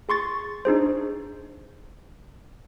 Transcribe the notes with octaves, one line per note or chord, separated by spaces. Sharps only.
G#4 C6 C#6 A6
D4 D#4 G#4 C5